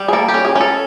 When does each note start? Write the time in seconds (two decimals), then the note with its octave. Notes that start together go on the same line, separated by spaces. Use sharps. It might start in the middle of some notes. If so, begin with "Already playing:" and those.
Already playing: G3
0.08 G#4
0.13 A#3 A4
0.28 G4
0.34 C#4
0.45 G#4
0.55 C#4
0.61 A4